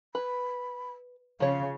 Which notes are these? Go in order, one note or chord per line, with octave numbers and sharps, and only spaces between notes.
B4 B5
C#3 F3 C#5 F5